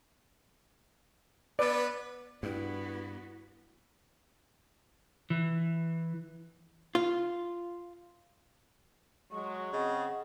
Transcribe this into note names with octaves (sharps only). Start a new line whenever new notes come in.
B3 B4 D5
G2 B3 E4 F#4
E3
F4
F#3 G#3 C#6
C#3 C4 G#4 D#5 F#5